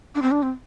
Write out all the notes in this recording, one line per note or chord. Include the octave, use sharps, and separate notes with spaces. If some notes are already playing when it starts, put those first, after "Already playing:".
D4
C4
D4
C4